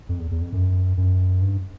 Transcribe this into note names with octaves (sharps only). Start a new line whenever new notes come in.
F2
E2
E2
F2
F#2
F#2
G2